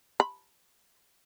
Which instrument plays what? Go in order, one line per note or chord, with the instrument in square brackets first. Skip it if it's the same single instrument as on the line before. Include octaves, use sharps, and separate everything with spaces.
[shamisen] B5